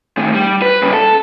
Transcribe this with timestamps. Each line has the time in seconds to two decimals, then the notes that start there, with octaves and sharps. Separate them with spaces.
0.17 A2 D#3
0.34 G3
0.62 B4
0.82 G2 C#3
0.93 A4